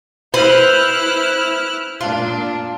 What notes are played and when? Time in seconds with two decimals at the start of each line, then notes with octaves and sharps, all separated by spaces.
0.34 E4 B4 C5 F6 F#6
2.01 A#2 D4 F4